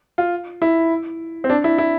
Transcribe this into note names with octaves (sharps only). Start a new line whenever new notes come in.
F4
E4
C4
D4
E4
E4